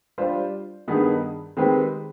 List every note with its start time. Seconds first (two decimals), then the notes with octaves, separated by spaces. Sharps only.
0.18 G3 D4 F4 C5
0.88 G2 D#3 B3 D#4 G#4
1.57 D#3 G#3 C4 G4 B4